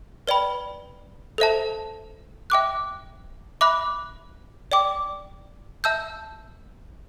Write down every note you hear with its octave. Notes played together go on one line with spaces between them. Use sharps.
B4 D5 G5 B5
A4 C5 E5 A5
E5 G5 D6 F#6
E5 B5 D6 F#6
D5 G5 D6
E5 A5 E6 G6